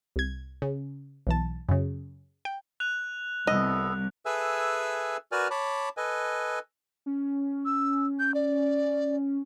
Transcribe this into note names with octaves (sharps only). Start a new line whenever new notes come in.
C2 G#6
C#3
B1 E3 A5
F#2 C#3
G5
F#6 F7
C2 B3 A4 D#5
G#4 A4 B4 E5 G#5 E6
F#4 A#4 B4 D5 G#5 F6
C#5 A5 B5 D6
A4 B4 D#5 G#5
C#4
E6
G6
D5